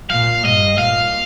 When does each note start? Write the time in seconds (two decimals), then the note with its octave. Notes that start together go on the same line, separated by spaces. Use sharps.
0.10 A#2 F5
0.45 G2 D#5
0.78 A#2 F5